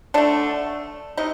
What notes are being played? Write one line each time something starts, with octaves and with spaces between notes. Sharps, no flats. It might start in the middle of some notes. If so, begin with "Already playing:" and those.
D3 A3 D4
C3 D#4